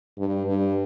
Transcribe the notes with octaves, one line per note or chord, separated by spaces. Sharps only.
G2
G2